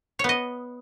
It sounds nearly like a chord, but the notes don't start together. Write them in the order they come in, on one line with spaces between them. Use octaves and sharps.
C#5 B3 D#5